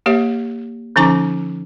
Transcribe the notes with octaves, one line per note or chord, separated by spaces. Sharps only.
A#3 G4 C#5 E5
D3 F3 C#4 D#4 A#5 D6